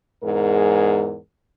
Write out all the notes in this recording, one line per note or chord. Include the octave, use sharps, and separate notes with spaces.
E2 G#2 G#4 A#4